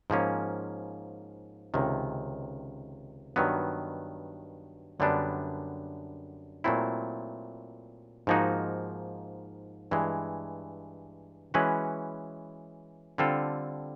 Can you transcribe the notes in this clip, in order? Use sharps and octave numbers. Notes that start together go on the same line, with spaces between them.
G#2 F3 A#3 C#4
C#2 C3 D#3
G2 D#3 F#3 B3
F#2 D3 G3 B3 D4
A#2 F#3 A3 C4 E4
G#2 F3 A#3 D#4 F#4
G2 E3 G#3
E3 G#3 C#4 F#4 B4
D3 G3 C4 F4 A4